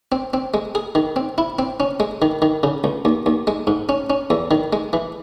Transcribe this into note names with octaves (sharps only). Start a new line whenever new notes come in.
C4
C4
G#3
G#4
D#3
C4
E4
C4
C#4
G#3
D#3
D#3
C#3
C#2
D#2
D#2
G#3
G#2
C#4
C#4
E2
D#3
G#3
E3